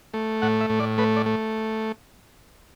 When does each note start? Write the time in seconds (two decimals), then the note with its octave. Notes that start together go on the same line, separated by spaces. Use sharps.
0.14 A3
0.42 A2 F#5
0.61 E5
0.70 A2
0.80 D5
0.98 A3 B4
1.16 D5
1.26 A3